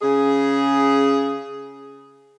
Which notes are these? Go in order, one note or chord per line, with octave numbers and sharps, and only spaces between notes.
C#3 G#4